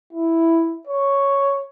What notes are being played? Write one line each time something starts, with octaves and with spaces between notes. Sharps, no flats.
E4
C#5